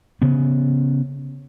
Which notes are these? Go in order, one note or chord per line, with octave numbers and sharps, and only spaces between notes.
C#3 B3